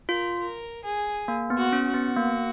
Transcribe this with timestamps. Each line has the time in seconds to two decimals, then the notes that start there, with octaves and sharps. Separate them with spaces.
0.09 F4 A#4
0.39 A#4
0.84 G#4
1.28 A#3
1.50 B3
1.57 F#4
1.73 C#4
1.88 F#4
1.94 B3
2.17 A#3